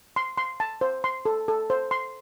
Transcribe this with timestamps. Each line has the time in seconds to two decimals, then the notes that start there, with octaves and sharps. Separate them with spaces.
0.16 C6
0.38 C6
0.60 A5
0.81 C5
1.04 C6
1.25 A4
1.48 A4
1.70 C5
1.91 C6